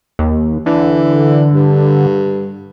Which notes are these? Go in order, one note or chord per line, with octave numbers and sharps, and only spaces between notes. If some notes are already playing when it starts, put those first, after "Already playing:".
D#2
D3 E3
G2